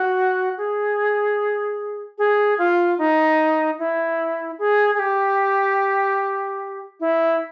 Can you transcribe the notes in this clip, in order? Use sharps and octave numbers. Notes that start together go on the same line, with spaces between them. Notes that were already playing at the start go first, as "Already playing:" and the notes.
Already playing: F#4
G#4
G#4
F4
D#4
E4
G#4
G#4
G4
E4